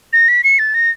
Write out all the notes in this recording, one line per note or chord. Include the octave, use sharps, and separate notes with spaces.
A#6
B6
C#7
A6
A#6